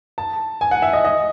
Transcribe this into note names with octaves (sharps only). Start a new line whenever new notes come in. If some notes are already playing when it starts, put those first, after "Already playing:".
A5
G#5
F#5
E5
D#5
D#5